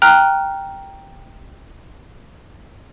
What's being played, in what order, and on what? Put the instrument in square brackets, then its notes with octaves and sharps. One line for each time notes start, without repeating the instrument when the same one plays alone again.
[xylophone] G5 A#5 F6 F#6